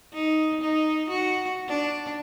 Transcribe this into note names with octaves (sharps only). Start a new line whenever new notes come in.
D#4
D#4
F#4
D4